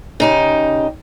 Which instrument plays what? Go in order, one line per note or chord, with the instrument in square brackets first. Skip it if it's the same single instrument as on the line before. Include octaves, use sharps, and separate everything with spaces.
[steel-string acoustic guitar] C#3 D#4 G4